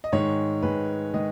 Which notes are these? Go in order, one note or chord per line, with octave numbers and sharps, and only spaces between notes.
D#5
G#2 D#3 G#3 C#5
G#2 D#3 G#3 B4
D#3 G#3 D#5